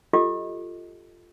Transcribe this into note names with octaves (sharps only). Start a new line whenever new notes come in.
F4 G4 A4 D#5 D6